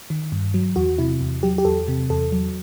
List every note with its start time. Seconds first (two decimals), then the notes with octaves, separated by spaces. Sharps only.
0.10 D#3
0.32 G2
0.54 F#3
0.76 E2 F#4
0.98 C3 E4
1.21 E2
1.43 F#3 G4
1.58 G4
1.65 E2 A4
1.88 C3
2.10 E2 A4
2.32 F#3